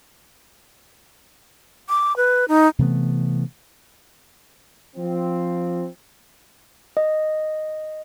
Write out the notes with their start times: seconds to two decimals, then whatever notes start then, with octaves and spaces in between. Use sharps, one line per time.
1.89 D6
2.17 B4
2.48 D#4
2.79 C3 E3 A3 B3
4.96 F3 C4
6.97 D#5